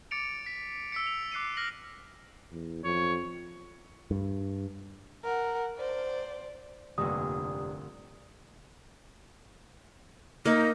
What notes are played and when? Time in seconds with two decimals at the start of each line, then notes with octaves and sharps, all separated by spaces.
0.11 D6 A6 C#7 D7 F7
0.46 B6
0.92 E6 B6 C#7
1.07 F7
1.32 D6 F#6 C7 C#7 D#7
1.57 F6 A#6 F#7
2.52 E2
2.84 F2 C#5
4.11 G2
5.24 A#4 F#5
5.77 C5 D5
6.98 F1 G2 A#2 D3 D#6
10.46 A#3 D#4